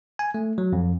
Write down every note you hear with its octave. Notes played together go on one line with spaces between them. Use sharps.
G#5
A3
F#3
F2